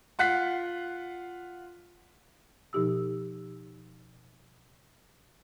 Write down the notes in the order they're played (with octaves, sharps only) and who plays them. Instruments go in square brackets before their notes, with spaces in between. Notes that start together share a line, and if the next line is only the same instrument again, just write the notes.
[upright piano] F4 F#5 F#6 B6 C7
[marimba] B2 F3 D#4 G4 D#6 E6